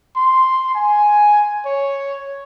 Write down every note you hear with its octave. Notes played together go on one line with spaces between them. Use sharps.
C6
G#5
C#5